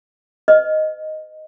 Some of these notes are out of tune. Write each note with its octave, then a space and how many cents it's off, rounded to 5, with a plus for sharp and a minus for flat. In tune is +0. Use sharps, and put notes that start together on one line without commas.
B4 +45 D#5 +0